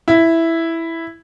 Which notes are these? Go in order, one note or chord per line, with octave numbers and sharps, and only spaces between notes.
E4